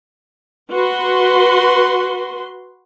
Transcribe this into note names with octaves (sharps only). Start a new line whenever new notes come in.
F#4 B4 C6